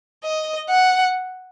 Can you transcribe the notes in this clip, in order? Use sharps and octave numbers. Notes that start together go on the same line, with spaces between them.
D#5
F#5